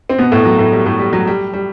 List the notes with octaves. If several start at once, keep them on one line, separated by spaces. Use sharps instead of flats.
C4
B2 B3
A2 A3
F#3
A2 A3
G3
A2 A3
G3
F#3
G3
G3